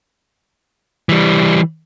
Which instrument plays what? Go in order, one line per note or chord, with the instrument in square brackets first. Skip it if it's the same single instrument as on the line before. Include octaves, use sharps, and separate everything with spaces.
[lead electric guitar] E3 G3